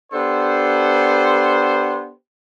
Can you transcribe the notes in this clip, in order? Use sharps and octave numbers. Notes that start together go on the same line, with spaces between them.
B3 D4 G4 A4 C5